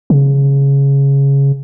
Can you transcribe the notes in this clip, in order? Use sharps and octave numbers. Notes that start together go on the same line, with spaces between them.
C#3